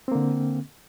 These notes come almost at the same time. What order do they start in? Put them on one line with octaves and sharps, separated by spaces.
C4 A#3 D3